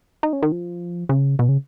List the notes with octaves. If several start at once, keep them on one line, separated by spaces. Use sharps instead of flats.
D#4
C#4
D#3
F3
C#3
B2
C#3